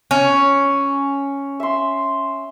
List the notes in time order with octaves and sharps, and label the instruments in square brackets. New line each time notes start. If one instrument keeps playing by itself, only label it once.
[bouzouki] C#4
[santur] E5 C6